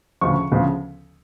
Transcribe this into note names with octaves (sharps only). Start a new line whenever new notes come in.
D2 C#3 F3 C#6
D2 C#3 F3